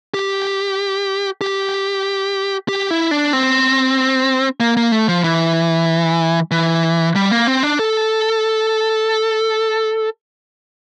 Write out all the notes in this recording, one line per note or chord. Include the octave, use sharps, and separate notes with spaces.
G4
G4
G4
E4
D4
C4
A#3
A#3
A3
F3
E3
E3
G3
A#3
C4
D4
A4